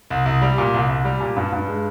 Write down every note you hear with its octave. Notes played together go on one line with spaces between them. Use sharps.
C2
C2
G3
A#2
C2
C2
G3
A#2
G2
G2
G#3